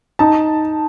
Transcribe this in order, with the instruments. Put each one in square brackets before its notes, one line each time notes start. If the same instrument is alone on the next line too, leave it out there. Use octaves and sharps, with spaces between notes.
[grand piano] D#4 A5